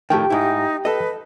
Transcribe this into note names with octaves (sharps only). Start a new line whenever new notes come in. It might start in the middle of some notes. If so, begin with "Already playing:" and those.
F2 A2 D#3 G4 G5
G#2 D#4 E4
A4 B4 D#5